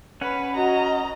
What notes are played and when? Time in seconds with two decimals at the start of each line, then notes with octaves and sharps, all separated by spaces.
0.21 C#4 B4 F#5
0.56 F#4 D#5 A#5